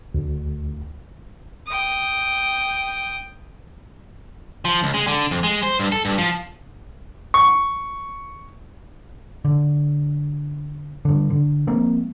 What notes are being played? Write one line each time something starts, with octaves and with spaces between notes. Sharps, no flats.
D2
G5 D#6
F3
C#2
G#3
D3
F2
G#3
C5
G2
A4
G2
F3
C#6
D3
G2 D3
D3
F3 G#3 A#3 C4